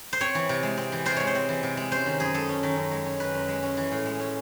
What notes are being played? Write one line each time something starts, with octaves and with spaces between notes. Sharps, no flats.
C5
C4 C#5
E3
C3
G#3
C4
E3
C3 C5
G#3 C#5
C5
C4
E3
C3
G#3
C#4 C5
D#3
F#2 G#4
G#3 A4
C#4
D#3
F#2
G#3
C#4
D#3 B4
F#2
G#3
C#4
E3
A2
G#3
C#4